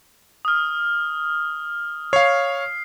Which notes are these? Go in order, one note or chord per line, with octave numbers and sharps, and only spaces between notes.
D#6 F6
C#5 F5 C7